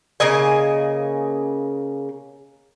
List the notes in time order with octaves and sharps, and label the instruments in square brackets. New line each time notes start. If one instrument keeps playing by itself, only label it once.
[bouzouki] C#3 A#3 D#5 G#5